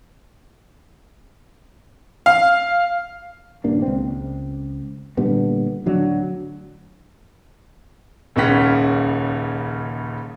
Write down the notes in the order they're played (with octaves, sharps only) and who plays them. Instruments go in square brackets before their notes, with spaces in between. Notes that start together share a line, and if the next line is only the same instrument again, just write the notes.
[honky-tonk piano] F5
[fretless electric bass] D#1 G2 A#3 D4
C#2 C4
A#2 D3 G3 B3
D1 D3 F#3 D4
[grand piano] D#1 C#2 C#3 C#4 F#5 B6